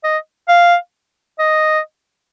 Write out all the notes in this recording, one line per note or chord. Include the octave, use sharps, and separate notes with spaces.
D#5
F5
D#5